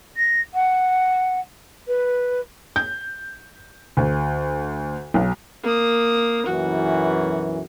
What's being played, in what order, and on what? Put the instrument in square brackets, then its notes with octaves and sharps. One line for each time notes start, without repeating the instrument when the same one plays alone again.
[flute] A#6
F#5
B4
[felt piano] G6
D2
B1
[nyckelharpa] A#3 D#6
[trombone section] B1 F#2 E3 [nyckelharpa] F#4